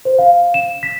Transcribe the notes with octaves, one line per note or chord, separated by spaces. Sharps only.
C5
F5
E7
B6